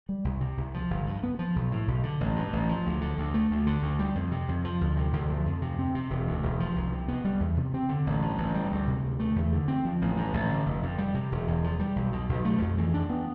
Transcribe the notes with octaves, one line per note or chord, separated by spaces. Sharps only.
G3
C2
C3
C2
F3
G1
G2
B3
F3
B1
A2
B1
D3
A1
G2
A1
F3
D2
D3
D2
A3
D2
D3
D2
G3
F2
C3
F2
F3
D2
C3
D2
F3
F2
C3
C4
C3
E1
D2
E1
F3
C2
C3
B3
G3
E2
C3
C4
D3
A1
G2
A1
G3
D2
C3
D2
A3
E2
D3
C4
F3
A1
G2
A1
D3
F1
F2
G3
C3
E1
E2
F3
G3
B1
B2
B1
A3
F2
E3
D4
B3